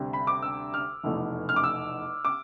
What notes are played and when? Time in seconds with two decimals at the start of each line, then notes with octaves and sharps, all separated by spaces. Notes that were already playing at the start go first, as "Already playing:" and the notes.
Already playing: D2 C3 G3
0.13 B5
0.27 D6
0.42 E6
0.74 F6
1.03 F1 E2 B2 A3
1.49 F6
1.56 D6
1.64 E6
2.25 D6